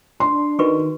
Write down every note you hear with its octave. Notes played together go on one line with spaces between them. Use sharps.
D4 C6
D#3 F#4 B4 C#6